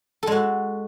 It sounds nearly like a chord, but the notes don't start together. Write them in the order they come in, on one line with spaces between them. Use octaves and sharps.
A4 G#3 F#4